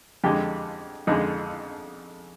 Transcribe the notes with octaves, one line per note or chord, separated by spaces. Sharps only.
F2 D3 G#3 G4
F2 D3 G#3 D#4